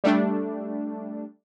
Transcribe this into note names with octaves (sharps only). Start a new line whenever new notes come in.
G3 A3 D4